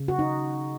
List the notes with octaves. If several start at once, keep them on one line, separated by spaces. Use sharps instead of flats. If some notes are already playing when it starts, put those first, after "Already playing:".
Already playing: C#3
F#4
D#4